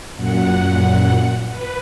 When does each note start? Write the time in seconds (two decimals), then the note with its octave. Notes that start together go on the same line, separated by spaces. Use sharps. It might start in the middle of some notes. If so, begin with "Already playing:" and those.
0.16 F#2 A#2 F#5
1.50 B4